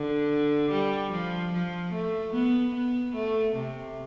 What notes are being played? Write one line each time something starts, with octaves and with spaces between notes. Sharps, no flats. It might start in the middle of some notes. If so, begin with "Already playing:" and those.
Already playing: D3
G3
F3
F3
A3
B3
B3
A3
C3